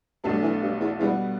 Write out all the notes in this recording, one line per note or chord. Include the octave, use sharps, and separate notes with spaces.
B1 G2 B2 A3 D4 A4
E3
G2
E2
E2 B2 G3 B3